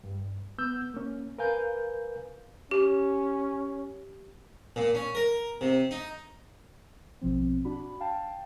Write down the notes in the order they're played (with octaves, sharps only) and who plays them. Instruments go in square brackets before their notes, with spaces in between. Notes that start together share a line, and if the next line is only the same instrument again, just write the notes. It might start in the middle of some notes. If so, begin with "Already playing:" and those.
[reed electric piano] G2
B3 E6 G6
A#3 C#4
A#4 B4 F5 G#5 G6
[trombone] C#4 [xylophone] G4
[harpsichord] A#2
C#4
A#4
C3
D#4
[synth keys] A#1 B2 F3 C4
D4 F#4 B5
F5 G5 A5